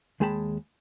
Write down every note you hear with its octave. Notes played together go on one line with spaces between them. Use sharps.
D#2 G#3 G#4 G5 A5 B5